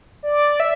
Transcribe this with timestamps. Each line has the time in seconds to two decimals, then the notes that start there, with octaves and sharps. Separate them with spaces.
0.23 D5
0.60 E5